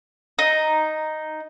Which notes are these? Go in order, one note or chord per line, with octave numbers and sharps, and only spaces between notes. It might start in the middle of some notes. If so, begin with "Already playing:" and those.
D#4